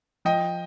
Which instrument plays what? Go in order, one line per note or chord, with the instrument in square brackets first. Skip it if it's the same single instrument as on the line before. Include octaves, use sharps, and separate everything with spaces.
[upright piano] F3 D#5 G5